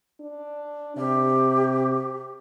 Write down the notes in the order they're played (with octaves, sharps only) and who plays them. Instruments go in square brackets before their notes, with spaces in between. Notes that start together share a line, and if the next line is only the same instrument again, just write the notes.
[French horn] D4
[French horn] C3 [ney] G4